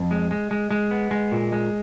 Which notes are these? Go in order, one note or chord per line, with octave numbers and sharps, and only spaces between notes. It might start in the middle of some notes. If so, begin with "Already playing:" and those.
Already playing: F2
G#3
G#3
G#3
G#3
B3
G#3
A#2
G#3